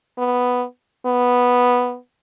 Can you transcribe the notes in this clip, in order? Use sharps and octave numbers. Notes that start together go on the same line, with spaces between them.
B3
B3